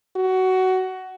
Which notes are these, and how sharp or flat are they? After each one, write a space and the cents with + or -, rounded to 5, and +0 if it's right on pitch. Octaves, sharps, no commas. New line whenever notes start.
F#4 +15